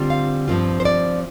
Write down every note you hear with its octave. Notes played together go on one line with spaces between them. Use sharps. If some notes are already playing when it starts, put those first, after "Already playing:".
Already playing: D3 G3 C4 F4
F5
G2 F3 A3 C4 F4
C5
D5